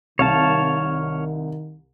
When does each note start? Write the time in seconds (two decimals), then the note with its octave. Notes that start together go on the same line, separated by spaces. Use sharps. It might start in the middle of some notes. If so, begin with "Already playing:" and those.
0.19 C2 D#3 C#5 F5 A5